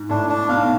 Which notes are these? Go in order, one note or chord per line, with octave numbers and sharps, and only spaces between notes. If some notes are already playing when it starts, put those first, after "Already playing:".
Already playing: G#2
A2 D4
D4
B1 B2 F5